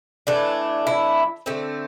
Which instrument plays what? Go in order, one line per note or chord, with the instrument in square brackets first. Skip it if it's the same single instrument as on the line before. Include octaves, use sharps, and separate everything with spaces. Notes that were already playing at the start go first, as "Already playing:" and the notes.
[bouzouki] E3 A3 D4
E4
D3 A3 C4